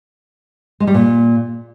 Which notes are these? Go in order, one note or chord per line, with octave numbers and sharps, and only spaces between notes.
G#3
G3
A#2